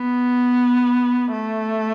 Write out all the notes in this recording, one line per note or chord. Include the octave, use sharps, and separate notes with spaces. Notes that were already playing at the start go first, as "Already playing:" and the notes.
Already playing: B3
A3